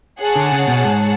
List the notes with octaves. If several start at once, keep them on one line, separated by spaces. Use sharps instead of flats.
G#4 C#5 F#5 A5
D3
C#3
B2
G#2